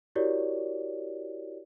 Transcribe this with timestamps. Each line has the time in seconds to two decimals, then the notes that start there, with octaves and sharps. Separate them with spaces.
0.15 E4 F#4 G4 A#4 C#5 D5